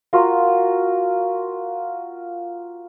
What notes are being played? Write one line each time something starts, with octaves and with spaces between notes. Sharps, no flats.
F4 F#4 A#4